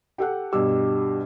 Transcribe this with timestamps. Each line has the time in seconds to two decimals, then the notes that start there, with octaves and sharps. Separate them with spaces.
0.18 G4 A4 F#5
0.53 G2 B2 G4 E6